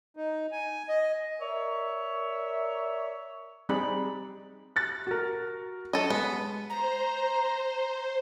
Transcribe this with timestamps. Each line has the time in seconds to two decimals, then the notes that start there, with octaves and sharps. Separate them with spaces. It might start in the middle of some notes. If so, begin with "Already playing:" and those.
0.17 D#4
0.52 G#5
0.89 D#5
1.42 A#4 C#5 D5 E5
3.69 G3 C4 D#4 G#4 D5 B5
4.76 F#6 A6
5.07 F#4 A#4
5.93 F#3 A4 D#5
6.10 G#3 B3
6.69 C5 A#5